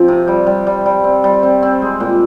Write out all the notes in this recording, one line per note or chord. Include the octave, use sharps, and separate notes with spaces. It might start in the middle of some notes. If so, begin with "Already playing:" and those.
Already playing: F3 C4
C3
G3
G3
G3
G3
C4
G3
C4
C4
G#3
A#2